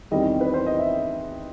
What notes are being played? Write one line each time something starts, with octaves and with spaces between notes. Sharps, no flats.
E2 D#3 G3 C4 D#5
B4
C5
D#5
E5